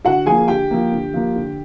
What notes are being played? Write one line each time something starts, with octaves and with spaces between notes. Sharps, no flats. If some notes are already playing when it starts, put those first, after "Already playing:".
D3 F#4 F#5
F3 A#3 G#4 G#5
D3 G4 G5
F3 A#3
D3
F3 A#3
D3